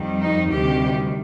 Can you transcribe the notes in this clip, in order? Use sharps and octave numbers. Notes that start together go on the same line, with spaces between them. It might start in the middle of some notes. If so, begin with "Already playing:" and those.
Already playing: F2 D#3 G3
D#4
D2 C3 D#3 G3 G4